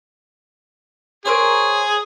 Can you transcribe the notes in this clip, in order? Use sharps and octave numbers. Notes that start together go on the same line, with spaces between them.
G#4 A#4 C5 C#5